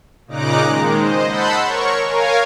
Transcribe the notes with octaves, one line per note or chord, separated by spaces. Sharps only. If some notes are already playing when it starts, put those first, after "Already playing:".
A#2 C#3 D#4 A#5 D6 F#6
D#3 G#3
C5 D#5
F#5 A5 B5 C6 E6 G6
A#4 C#5 C#6
A#4 C#5 F5 G#5